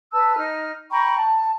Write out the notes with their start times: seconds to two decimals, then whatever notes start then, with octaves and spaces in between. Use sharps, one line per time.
0.12 B4 A5 E6
0.36 D#4 F6
0.91 G5 A#5 B5 C#6
1.17 A5